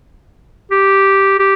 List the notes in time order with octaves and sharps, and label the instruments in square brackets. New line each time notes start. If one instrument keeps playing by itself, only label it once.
[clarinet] G4
G4